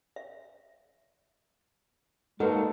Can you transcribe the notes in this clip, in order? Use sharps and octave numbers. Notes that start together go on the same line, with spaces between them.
E5
G#3 A#3 D#4 F#4 A4 B4 F#5